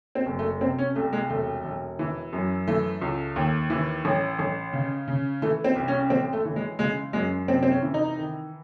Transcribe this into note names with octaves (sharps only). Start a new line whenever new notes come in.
C4
F#1
A3
C3 C4
C#4
C2 A3
G#3
E1 A3
E1
E3
F#2
E3 A3
C#2
D#2
E3
A1
A1
C#3
C#3
E3 A3
C4
C2
C#4
A1 C4
A3
E3
G#3
C#3 G#3
F#2 G#3
C3 C4
C4
C#4
E3
D#4
D#3